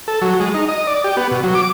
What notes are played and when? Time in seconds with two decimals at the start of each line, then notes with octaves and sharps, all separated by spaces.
0.08 A4
0.22 F#3
0.40 G#3
0.54 D#4
0.68 D#5
0.87 D5
1.04 G4
1.17 B3
1.31 B2
1.43 F#3
1.55 D6